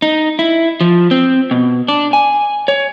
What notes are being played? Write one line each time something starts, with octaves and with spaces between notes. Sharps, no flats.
D#4
E4
F3
C4
B2
D4
G#5
C#5